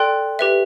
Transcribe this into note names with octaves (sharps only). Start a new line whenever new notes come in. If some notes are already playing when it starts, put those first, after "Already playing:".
Already playing: A4 D5 G5 C6 F#6
G4 B4 E5